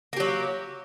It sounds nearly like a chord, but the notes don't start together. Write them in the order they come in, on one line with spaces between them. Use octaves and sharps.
A#3 G4 F#3